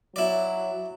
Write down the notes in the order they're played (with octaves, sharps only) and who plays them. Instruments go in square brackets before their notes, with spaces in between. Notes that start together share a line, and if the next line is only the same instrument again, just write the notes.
[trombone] F#3 [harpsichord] E4 D5